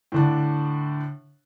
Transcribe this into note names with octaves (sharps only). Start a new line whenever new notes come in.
A2 D3 D4